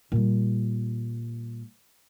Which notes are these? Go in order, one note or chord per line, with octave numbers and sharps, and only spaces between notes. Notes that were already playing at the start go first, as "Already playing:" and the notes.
A#2 G3